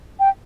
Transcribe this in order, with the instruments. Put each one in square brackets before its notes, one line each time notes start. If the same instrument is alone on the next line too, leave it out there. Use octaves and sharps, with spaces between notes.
[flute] G5